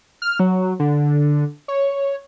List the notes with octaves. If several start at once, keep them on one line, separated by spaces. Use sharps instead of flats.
F6
F#3
D3
C#5